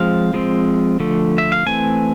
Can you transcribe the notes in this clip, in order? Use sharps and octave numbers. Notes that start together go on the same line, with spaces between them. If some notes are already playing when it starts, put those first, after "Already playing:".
Already playing: F3 G#3 C4 F5
F3 G#3 C4
D3 F3 A3
E5
F5
E3 A3 C4 G#5